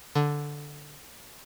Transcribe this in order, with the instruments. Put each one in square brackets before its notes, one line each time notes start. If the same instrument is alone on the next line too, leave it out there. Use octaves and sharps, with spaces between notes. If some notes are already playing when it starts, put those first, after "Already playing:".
[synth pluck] D3